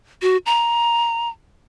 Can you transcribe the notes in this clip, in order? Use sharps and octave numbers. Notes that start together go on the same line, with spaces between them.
F#4
A#5